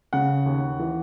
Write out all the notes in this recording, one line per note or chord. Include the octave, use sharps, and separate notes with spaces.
C#3 F#5
D#2
E3